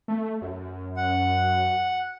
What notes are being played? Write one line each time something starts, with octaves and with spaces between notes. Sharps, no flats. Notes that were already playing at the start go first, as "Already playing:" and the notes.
A3
F#2
F#5